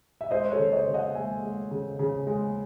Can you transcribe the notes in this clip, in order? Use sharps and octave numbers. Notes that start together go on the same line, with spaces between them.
E5
G#3 C5 D#5
A4 C#5
C#3
C5 D#5
C#3
D#5 F#5
G#3 E5 G#5
G#3
C#3
C#3
G#3